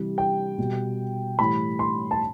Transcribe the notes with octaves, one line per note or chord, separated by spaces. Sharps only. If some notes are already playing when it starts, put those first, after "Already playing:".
Already playing: C3 E3 G3
G5
B2 G3
A2 E3 G3 B5
C6
A5